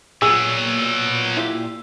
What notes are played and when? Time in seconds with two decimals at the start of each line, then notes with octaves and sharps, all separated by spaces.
0.22 A#2 F#3 B3 G#4 E6
1.37 E4 F4 G4